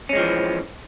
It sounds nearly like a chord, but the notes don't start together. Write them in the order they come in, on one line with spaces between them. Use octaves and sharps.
C#4 G#3 F3 E3